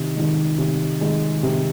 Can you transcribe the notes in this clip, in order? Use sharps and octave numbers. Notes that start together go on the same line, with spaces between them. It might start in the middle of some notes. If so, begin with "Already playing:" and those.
Already playing: C3 D#3
D#3 G#3
C3
D#3 G#3
C3